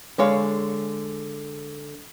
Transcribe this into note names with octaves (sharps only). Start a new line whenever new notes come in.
D3 G#3 C#5 F5